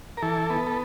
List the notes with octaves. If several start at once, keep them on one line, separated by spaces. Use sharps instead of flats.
A#4
E3 A4
B3
A4